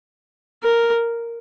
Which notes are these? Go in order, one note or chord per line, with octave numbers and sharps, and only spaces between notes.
A#4